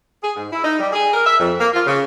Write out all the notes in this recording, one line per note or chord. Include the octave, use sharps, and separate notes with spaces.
G#4
G#2
E4
D#4
G3
G#4
A#4
E5
F2
A#3
F4
C#3